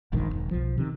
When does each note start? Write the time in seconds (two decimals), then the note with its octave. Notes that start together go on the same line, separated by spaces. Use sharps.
0.12 E1 A#1 G#2 D#3
0.30 E1 B1
0.51 B1 F3
0.78 C3 D#3